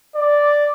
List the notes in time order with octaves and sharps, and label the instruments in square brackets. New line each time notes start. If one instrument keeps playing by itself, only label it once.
[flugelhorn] D5